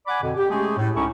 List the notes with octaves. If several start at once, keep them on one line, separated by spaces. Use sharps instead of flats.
D5 F#5 G#5 B5 D6
F2 B2 D3
G4
G#3 A3 C#4 G4 G#4
A2
C#2 C#4 D#4 E4 A4 C#6